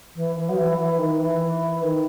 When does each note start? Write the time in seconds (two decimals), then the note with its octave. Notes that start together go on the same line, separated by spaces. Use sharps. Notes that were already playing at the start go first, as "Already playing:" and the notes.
0.15 E3
0.35 E3
0.48 F#3
0.57 E3
0.77 E3
0.97 D#3
1.19 E3
1.82 D#3